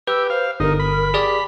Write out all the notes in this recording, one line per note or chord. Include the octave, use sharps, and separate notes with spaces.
G4 B4 E6
C5 F5
G1 D#4 A#4
B5
G4 G#4 D5